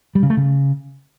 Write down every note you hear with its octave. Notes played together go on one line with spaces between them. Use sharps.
G3
C#3
A3
C#3